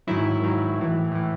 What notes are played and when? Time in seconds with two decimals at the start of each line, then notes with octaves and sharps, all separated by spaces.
0.07 G#2 D#3 F#3 E4
0.43 G#2 D#3 F#3
0.78 A2 E3
1.12 A2 E3